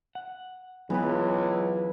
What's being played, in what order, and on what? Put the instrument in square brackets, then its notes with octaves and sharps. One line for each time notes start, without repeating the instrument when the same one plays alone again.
[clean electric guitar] F#5
[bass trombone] C#2 [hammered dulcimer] E3 B4 [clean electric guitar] F#3 B3